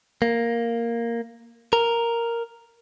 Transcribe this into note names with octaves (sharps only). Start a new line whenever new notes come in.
A#3
A#4